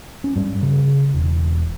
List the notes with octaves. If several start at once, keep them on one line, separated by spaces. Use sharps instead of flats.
C#4
G2
C#3
E1